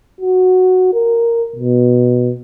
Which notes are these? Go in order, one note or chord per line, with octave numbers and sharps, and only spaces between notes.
F#4
A#4
B2